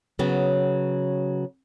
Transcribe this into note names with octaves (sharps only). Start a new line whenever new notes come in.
C#3 F#3 B3